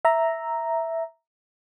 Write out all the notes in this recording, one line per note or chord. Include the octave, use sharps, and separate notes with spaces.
E5 A#5